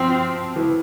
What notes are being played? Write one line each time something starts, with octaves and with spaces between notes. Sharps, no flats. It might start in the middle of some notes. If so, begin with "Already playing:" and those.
Already playing: F3 C4
E3